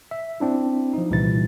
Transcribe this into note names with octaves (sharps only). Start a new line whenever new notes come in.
E5
C4 D4 E4
F3 D#4
C2 A#2 E3 G3 E4 A6